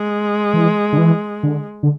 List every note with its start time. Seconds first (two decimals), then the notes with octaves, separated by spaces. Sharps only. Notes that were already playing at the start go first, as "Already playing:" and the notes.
Already playing: G#3
0.53 E3
0.93 D3
0.98 E3
1.43 D3
1.83 D3